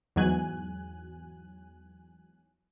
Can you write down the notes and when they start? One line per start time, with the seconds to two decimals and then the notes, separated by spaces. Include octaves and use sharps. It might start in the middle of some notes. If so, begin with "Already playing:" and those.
0.16 E2 G#2 F#3 G#5 F#6